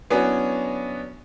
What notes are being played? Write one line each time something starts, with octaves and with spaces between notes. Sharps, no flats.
F#3 B3 C#4 D4 E4 F#4